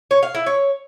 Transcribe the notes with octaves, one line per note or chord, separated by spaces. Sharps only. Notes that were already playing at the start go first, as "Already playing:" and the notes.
C#5
F5
E4
C#5